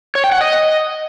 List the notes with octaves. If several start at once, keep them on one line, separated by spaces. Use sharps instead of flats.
C#5
G5
F#5
D#5